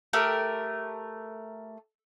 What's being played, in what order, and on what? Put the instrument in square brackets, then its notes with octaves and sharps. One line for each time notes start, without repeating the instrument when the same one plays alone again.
[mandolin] A3 G4 A#4